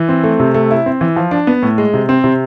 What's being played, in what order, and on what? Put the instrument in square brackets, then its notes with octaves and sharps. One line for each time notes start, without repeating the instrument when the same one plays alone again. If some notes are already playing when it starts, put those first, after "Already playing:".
Already playing: [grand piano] E3
C4
A3
C3
A3
E4
C4
E3
F3
D4
B3
A2
G#3
C3
C4
C3